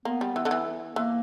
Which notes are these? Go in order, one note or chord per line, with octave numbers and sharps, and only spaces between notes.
A#3 B3
G3
E3
D3
E3
E3 A#3